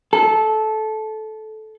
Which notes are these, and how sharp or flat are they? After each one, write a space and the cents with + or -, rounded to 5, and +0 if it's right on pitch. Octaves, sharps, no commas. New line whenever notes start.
A4 -15